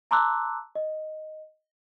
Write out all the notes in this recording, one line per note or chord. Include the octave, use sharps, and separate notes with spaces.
A5 A#5 C6 D6 E6 F#6
D#5